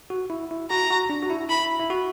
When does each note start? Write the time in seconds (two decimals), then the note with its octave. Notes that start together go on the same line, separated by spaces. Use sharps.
0.10 F#4
0.30 E4
0.51 E4
0.71 F#4 A#5
0.91 F#4
1.10 D4
1.23 F#4
1.30 E4
1.49 E4 B5
1.80 E4
1.90 F#4